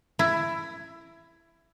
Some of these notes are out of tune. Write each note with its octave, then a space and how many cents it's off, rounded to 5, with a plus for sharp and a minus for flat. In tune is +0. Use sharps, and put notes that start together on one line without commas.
E4 +15